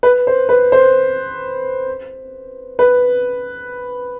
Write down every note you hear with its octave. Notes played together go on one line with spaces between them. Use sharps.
B4
C5
B4
C5
B4